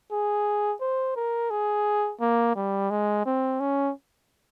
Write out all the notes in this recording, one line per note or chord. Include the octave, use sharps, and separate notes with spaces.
G#4
C5
A#4
G#4
A#3
G3
G#3
C4
C#4